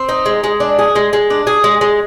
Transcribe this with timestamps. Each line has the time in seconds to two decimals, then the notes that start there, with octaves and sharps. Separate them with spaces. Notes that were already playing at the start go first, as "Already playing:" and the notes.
Already playing: C4
0.09 D#4
0.26 G#3
0.44 G#3
0.60 D4
0.79 G#4
0.96 G#3
1.13 G#3
1.30 D4
1.47 G#4
1.64 G#3
1.81 G#3